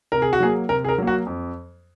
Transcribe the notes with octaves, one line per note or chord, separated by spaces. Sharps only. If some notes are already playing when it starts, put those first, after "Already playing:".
C3 A#4
G#4
F#4
F#3 A#3 G#4
C3 A#4
G#4
A#4
F#3 A#3
F#4
F2